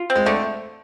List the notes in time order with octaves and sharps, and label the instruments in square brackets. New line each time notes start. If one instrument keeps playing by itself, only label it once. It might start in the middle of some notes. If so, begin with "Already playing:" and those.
Already playing: [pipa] F4
C4
[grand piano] G#3
[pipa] D3 [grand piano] A3